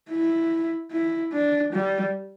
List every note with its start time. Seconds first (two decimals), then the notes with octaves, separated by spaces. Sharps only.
0.11 E4
0.92 E4
1.33 D4
1.73 G3